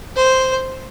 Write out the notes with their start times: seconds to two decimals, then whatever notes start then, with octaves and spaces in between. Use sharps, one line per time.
0.16 C5